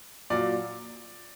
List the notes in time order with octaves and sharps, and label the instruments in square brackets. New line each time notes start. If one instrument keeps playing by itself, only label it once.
[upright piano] A#2 F#3 D5